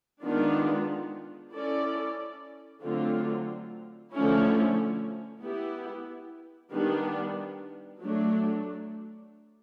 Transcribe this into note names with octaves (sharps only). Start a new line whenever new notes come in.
D#3 G#3 B3 D4 F4
C#4 E4 A4 D5
D3 F#3 A3 C4 F4
D3 F3 A3 C#4 E4
B3 E4 G4
D#3 G3 B3 D4
F#3 A3 D4